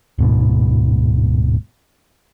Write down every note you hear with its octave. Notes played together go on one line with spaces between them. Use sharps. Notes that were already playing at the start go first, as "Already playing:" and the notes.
D1 G#2 B2